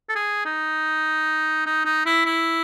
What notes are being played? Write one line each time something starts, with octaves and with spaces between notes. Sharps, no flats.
A4
G#4
D#4
D#4
D#4
E4
E4